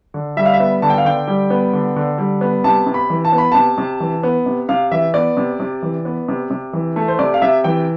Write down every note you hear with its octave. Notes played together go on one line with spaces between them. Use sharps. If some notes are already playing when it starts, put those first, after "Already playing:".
D3
G3 E5
F5
E5
B3
D3 A5
G5
F5
D3 G5
G3
B3
D3
D3
G3
B3
C3 A5
C3
B5
E3
A5
B3
B5
C3 A5
C3
E3
B3
C3
C3 F5
E3 E5
B3 D5
C3
C3
E3
B3
C3
C3
E3
A3
C5
C3 D5
F5
C3 E5
E3 G5